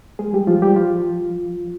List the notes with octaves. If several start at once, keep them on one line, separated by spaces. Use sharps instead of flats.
G#3 G#4
G3 G4
F3 F4
G3 G4
F3 F4